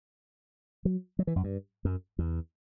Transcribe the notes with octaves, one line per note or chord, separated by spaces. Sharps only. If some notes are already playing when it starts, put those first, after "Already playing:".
F#3
F#3
E3
F#2
G2
F#2
E2